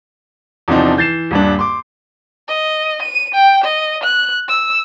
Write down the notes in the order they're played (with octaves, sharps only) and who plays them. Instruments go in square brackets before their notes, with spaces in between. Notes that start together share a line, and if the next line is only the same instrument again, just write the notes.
[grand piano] E2 C3 F3 C4 D4 D#4
E3 G6 A6 C7 E7
D#1 G2 D4
C6 D6
[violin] D#5
D#7
G5
D#5
F#6
E6